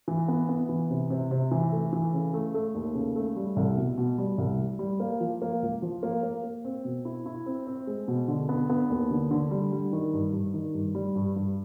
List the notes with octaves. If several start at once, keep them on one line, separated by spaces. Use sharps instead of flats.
E3
B3
B3
E3
C3
C3
C3
E3
A3
E3
C#3
A3
A3
D#2
C#3
A3
G3
C2
B2
B2
G3
C2
G3
G3
A#3
F3
A#3
C#2
F3
A#3
A#3
A#3
C4
B2
E4
E4
C4
C4
G#3
B2
D3
B3
B3
D#2
D3
D3
G3
G3
D#3
G2
G2
D#3
G2
G3
G2
G2